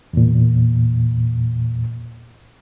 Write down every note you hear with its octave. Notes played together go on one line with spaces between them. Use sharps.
E2 A#2